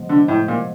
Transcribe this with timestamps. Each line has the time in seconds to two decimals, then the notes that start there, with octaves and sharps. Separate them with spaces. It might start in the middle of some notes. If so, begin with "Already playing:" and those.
Already playing: C3 F3 G#3 B3
0.09 D3
0.28 A2
0.48 A#2